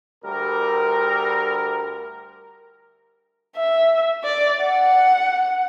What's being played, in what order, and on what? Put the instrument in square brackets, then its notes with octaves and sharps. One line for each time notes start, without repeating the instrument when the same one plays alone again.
[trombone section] D2 G3 A#4
[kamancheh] E5
D5
F#5